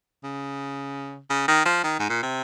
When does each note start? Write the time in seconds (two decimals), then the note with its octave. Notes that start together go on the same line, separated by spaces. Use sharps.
0.24 C#3
1.30 C#3
1.48 D#3
1.65 F3
1.84 D#3
1.99 G#2
2.09 A#2
2.23 C3